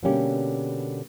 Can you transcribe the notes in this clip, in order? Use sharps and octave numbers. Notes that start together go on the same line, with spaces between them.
B2 D3 G3 A#3 C#4 G4